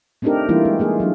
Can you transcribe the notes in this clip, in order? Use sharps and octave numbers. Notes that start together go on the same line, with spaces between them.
A3 C4 D4 D#4 G4 A#4
E3 G3 A3 A#3 E4 F4
G#3
A3 A#3 G#4
F#3 D4